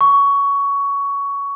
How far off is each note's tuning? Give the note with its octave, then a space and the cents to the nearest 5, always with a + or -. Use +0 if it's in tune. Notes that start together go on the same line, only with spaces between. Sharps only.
C#6 +15